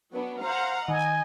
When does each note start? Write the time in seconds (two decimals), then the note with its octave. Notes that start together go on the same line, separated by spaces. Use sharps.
0.12 F#3 B3 D4
0.42 C5 F5 F#5 A#5
0.88 D#3 D#5 G#5